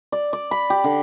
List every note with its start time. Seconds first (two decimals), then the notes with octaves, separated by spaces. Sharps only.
0.12 D5
0.33 D5
0.51 B5
0.70 G4
0.84 D3